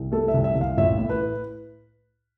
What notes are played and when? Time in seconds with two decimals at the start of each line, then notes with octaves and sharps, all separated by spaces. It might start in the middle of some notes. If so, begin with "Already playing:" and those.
Already playing: C2
0.12 A3 A4
0.28 E5
0.34 C2
0.44 E5
0.55 C2
0.61 F5
0.77 A1 E5
0.99 A2
1.10 B4